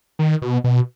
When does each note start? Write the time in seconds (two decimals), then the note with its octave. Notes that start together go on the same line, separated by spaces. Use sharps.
0.19 D#3
0.42 B2
0.64 B2